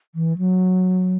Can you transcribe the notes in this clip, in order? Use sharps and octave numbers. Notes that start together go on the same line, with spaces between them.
E3
F#3